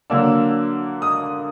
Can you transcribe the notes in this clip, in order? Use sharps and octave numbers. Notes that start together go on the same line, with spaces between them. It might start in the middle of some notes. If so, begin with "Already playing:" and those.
D3 F#3 A#3 D4 E6
D#6